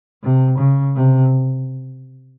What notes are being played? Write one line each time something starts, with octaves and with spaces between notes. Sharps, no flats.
C3
C#3
C3